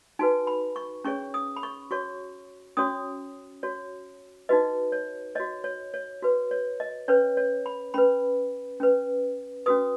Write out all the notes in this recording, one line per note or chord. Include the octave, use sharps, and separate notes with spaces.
D#4 F#4 B4 G#5
B5
C#6
C#4 G#4 C#5 C#6
D#6
B5
C#6
F#4 C#5 C#6
C#4 F#4 C#5 D#6
F#4 C#5
D#4 F#4 B4 D#5
C#5
F#4 C#5 D#5
C#5
C#5
F#4 B4
C#5
D#5
C#4 B4 C#5
C#5
B5
C#4 B4 B5
C#4 B4
C#4 F#4 B4 D#6